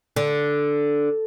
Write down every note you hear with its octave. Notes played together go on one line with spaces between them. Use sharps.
D3